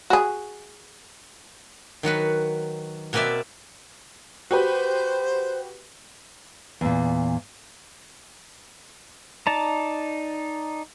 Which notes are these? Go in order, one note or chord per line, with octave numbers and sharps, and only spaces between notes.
F#4 G#4
D#3 F#3 F#4 B4
B2 A#3 C4 B4 D5 E5
F#4 G4 B4 C5
E2 A#2
D#4 D5 A5 A#5